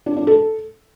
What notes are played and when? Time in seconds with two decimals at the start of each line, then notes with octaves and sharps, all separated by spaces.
0.06 D4
0.17 D4
0.27 A4